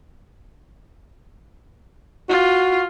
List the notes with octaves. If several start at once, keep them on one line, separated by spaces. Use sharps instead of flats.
F4 F#4